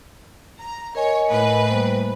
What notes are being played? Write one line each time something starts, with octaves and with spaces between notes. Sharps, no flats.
A#5
A#4 C#5 D#5 G#5
A2 B4
G3 A#3 C5